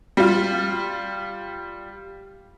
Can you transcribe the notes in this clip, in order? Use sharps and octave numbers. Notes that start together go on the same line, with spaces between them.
G3 F4